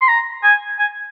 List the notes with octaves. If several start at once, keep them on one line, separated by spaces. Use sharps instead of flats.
C6
A#5
G#5
G#5